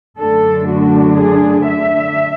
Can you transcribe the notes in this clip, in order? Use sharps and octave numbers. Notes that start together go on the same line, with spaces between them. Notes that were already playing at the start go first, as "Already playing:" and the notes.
F#2 D3 A3 D4 A4
F#4
G#4
E5